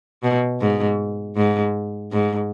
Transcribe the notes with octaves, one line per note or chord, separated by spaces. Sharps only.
B2
G#2
G#2
G#2